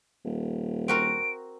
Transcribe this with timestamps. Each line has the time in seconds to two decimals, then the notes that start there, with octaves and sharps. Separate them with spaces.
0.25 D#1
0.88 C4 F#4 A#4 D7